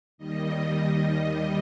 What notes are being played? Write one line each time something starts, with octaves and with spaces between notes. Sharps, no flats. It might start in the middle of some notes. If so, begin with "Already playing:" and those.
D#2 D#3 G3 D#5